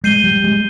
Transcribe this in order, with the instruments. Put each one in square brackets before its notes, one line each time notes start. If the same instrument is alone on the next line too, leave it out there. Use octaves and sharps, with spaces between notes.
[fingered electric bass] G#3 [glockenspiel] G6 C7 D#7 G7
[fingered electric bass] G3
G#3